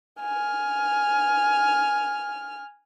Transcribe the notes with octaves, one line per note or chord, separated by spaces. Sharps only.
G#5 F6